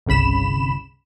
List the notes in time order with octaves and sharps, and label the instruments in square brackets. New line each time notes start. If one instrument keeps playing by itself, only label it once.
[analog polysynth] G1 C2 C#3 B5 E7